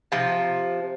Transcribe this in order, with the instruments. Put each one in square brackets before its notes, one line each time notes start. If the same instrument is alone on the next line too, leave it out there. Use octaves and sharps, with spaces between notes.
[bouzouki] C3 F3